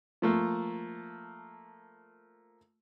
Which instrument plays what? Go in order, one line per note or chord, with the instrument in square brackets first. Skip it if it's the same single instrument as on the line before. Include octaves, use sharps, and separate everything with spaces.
[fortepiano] F3 A3 A#3